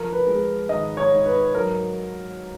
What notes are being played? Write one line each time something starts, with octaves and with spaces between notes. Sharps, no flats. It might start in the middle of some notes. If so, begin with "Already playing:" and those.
Already playing: F3 A#4
B4
G#3
G#1 D#5
C#5
G#2
B4
F#3 A#4